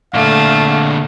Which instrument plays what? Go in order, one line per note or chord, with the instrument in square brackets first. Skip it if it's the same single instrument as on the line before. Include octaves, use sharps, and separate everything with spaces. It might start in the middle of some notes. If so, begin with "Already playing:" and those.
[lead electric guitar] A#2 D3 [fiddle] A3 [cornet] F5